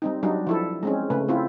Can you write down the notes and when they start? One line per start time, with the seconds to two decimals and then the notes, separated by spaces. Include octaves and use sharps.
0.02 G3 C4 D#4
0.23 F#3 G3 D4 D#4 F#4
0.47 F3 E4 A4
0.83 G#3 C4 C#4
1.10 C#3 A3 B4
1.28 C4 E4 F4